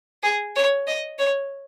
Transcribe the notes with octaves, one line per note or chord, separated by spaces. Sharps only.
G#4
C#5
D#5
C#5